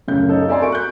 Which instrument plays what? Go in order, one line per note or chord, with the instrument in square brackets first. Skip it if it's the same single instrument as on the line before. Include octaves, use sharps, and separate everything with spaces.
[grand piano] D1 F#2 C#3 A3 G6
D#4 A4 C#5 D#5
C4 A4 D5 E5 G#5 C6
F#4 A#4 C#6 D7
F#6 G6